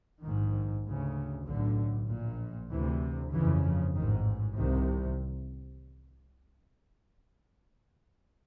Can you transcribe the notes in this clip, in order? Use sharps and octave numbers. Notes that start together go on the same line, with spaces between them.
A#1 G#2 D#3
D2 C#3
B1 A2 D3
A#1 A#2
D2 C3 E3
G1 F2 C#3 E3
F3
A1 G#2 D#3
C2 C3 D#3